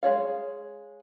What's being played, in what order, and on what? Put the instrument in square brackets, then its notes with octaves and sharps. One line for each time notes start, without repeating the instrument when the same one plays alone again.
[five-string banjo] G#3 G#4 C#5 F5